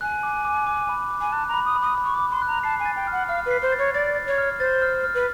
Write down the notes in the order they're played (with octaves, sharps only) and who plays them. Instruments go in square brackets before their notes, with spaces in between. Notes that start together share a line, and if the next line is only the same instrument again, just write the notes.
[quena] G#5 [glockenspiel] F#6
[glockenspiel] D6
D6
D6
B5
D6
[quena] G#5
[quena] A5 [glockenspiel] F#6
[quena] A#5
[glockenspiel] B5
[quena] D#6
[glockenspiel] B5
[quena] D#6
[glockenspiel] B5
[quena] C#6
D6
[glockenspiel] B5
[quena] C6
[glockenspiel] F#6
[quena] A#5
[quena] A5 [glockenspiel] C7
[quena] G#5
[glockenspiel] A6
[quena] G5
[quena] F#5 [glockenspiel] F6
[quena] F5 [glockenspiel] F6
[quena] B4 [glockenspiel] C7
[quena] C5
[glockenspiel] A6
[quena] C#5
[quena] D5 [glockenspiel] A6
[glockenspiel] A6
[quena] C#5
[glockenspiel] F6
[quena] C5 [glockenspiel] A6
[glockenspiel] F6
F6
[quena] B4